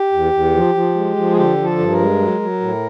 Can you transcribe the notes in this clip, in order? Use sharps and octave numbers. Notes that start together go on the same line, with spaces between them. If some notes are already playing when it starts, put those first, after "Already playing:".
Already playing: G4
E2
E2
F3
F3
G#3
F3
G#4
D3 G4
F3
A4
G2
A#4
G#3
F#3
F#3
A2